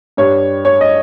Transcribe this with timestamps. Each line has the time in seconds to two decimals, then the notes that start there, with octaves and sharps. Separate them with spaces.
0.17 G2 G3 C#5
0.65 C#5
0.81 D#5